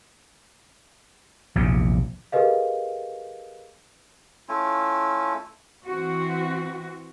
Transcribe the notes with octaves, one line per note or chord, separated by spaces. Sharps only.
A#1 E2 C3
G4 G#4 A#4 B4 D#5 F5
A3 C#4 E4 F4
E3 C4 F#4